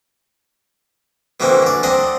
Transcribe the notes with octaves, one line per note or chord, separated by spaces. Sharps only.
B2 D3 E3 A#3 C4
D3 D5
C4 D4 D#5 F#5